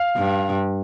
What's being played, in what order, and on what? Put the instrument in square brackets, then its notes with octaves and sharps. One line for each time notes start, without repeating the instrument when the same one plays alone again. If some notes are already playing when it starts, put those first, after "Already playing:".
Already playing: [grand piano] F5
[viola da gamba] G2